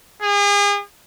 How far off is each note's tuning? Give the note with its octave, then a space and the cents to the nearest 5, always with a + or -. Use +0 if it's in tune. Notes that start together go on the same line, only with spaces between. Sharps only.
G#4 -40